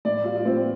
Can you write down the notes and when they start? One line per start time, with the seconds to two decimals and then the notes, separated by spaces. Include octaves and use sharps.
0.05 A2 D5
0.24 G3 F4
0.36 F4
0.45 A2 C4